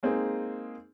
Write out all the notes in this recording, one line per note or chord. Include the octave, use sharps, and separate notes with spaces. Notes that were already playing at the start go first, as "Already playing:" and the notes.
G#3 A#3 C4 D#4 G#4